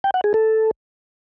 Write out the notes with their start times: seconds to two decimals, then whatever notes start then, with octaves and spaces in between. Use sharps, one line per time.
0.04 G5
0.14 F#5
0.24 G#4
0.34 A4